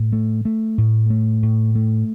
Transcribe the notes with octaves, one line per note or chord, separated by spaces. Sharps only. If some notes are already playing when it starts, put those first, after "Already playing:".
Already playing: A2
A3
A3
A2
A3
A2
A3